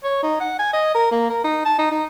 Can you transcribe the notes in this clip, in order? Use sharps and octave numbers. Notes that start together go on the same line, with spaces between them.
C#5
D#4
F#5
G#5
D#5
A#4
A#3
A#4
D#4
A5
D#4
D#4